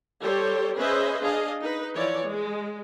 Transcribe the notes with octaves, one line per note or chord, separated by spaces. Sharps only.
G3 G4 A4 C5 C#5
C#4 G#4 B4 C5 D#5 E5
D4 G#4 D#5 F5
D#4 B4
E3 F3 C#5 D5
G#3